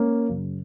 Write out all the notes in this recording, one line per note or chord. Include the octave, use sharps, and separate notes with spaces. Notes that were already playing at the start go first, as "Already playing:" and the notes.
Already playing: A#3 C#4
F#2 C#3